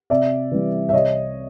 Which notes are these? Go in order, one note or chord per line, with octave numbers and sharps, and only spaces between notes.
C3 D5 E5
E3 G3
E5
C2 C#5 D#5